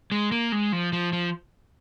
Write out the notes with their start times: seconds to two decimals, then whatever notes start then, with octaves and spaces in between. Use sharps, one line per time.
0.12 G#3
0.32 A#3
0.52 G#3
0.72 F3
0.93 F3
1.13 F3